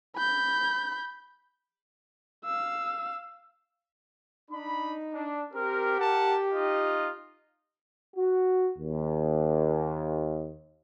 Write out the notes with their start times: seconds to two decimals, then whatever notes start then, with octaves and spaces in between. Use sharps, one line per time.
0.17 B5 G6
2.45 F5 E6
4.51 D4 D#4 B5
5.12 D4
5.53 C4 G4 A#4
5.98 A#4 F#5 A5
6.51 D#4 F4 D#5
8.17 F#4
8.79 D#2